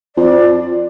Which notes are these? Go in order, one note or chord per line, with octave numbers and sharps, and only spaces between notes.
F2 D5